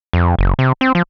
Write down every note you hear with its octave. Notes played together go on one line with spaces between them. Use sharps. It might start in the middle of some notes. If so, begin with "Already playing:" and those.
F2
F#1
C3
C4
F3